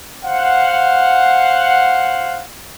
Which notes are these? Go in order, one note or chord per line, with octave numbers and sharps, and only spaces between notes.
C5 F5 F#5